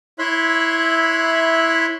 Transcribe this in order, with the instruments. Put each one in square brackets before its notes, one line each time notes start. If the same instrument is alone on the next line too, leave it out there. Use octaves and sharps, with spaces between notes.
[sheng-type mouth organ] E4 C#5 E5 B5 C6 F#6